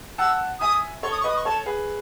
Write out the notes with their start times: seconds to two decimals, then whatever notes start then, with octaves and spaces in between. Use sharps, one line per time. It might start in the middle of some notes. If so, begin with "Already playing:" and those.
0.18 F#5 A5 E6
0.60 E5 G#5 D#6
1.03 A4 C#5 C#6
1.12 D#6
1.21 C#6
1.24 B4 D#5 D#6
1.37 C#6
1.45 A4 C#5 A5
1.66 G#4 B4